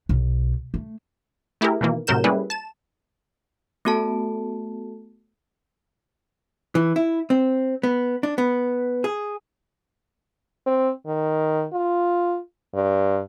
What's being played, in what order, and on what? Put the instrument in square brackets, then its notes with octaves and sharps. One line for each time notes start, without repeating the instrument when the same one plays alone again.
[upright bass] B1
A3
[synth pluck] A3 E4 G4 G#4 A#4
B2 D#3 E3 A#3
A2 C3 F#3 A#4 G6 E7
G3 A#3 C#4 E4 G#4 B4
A5 E7
[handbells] A3 B3 F#4 A4 A5
[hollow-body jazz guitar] E3
E4
C4
B3
D4
B3
G#4
[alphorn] C4
D#3
F4
G2